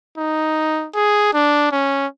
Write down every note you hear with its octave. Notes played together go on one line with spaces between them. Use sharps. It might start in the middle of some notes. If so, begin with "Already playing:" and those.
D#4
G#4
D4
C#4